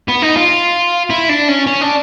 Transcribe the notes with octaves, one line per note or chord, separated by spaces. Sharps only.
B3
D#4
F4
E4
D4
C#4
C#4
D4